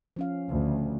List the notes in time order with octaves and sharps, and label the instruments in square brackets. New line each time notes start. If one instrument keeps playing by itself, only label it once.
[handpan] F3 C#4 F5
[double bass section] D2 [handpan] C#3